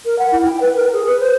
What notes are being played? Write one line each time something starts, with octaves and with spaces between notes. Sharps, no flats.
A#4
F#5
E4
G5
B4
A#4
G#4
B4
C5